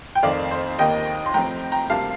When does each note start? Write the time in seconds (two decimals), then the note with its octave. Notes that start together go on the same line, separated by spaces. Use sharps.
0.15 G5
0.23 F2 D#3 A3 C4 D5 F5
0.51 C5
0.78 D#2 D#3 A#3 D#5 G5
1.26 C6
1.34 A2 F3 C4 G5 A#5
1.72 G5 A#5
1.90 D2 C3 G3 A#3 F5 A5